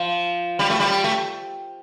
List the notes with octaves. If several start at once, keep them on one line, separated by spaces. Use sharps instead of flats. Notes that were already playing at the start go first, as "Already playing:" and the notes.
Already playing: F3
G3
A3
G3
A3